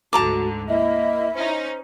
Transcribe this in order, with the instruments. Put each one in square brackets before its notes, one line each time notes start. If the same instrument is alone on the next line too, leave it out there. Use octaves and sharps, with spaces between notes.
[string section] D2 G#2 D3 [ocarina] F#4 [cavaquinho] A5 A#5 D6
[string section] A#3 [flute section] E4 E5 [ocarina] D#5
[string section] C#4 D#4 [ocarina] C5